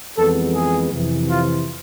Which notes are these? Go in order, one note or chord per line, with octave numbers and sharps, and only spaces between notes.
F2 E3 G#3 B3 A4
G#4
F2 C3 E3
F4